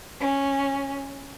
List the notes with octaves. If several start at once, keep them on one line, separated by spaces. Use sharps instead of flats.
C#4